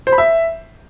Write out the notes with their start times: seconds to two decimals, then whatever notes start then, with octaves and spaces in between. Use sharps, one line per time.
0.07 C5
0.12 B5
0.18 E5